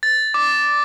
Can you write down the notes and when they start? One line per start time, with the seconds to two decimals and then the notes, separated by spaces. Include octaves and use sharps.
0.03 A6
0.34 D6